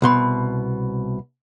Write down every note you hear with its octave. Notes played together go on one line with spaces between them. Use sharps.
C2 B2 C6